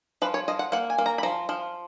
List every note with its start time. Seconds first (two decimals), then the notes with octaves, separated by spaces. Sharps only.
0.22 F3 B4
0.34 C#5
0.48 F3 D#5
0.59 F#5
0.72 A#3 F#5
0.90 G#5
0.98 A#3
1.06 A#5
1.18 B5
1.23 F3 A#5
1.49 F3